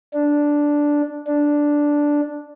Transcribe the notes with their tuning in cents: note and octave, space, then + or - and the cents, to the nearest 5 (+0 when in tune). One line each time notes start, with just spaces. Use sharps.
D4 -5
D4 -5